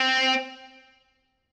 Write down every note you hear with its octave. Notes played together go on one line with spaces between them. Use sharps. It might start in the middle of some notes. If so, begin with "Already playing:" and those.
Already playing: C4